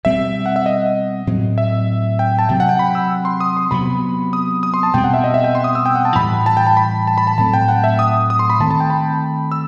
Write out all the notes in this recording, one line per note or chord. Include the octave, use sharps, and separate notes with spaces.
B2 G3 C4 E5
F#5
E5
D#5
A2 F#3 C4
E5
G5
A5
C3 F#3 C4 G5
F#5
G5
B5
E6
C6
D#6
C6
C3 F#3 B3 B5
D#6
D#6
C6
A5
B2 G3 C4 G5
F#5
E5
D#5
E5
G5
C6
D#6
E6
G5
F#5
A5
A2 E3 G3 B5
A5
G5
A5
B5
A5
B5
A5
A2 F#3 A3 C4 A5
G5
F#5
E5
D#6
D#6
C6
B5
D#3 A3 C4 A5
A5
G5
B5
E6